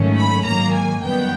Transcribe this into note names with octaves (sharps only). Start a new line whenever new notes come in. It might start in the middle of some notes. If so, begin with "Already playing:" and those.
Already playing: G#2 D#3 F#3 A3 C#4
B5
G#2 D#3 F#3 A#3 A#5
G#5
F#2 D#3 G3 B3 G5